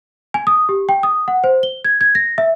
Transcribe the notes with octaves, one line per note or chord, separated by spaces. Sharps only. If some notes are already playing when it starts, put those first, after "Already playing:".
G#5
D#6
G4
G5
D#6
F#5
C5
G7
G#6
G#6
A#6
E5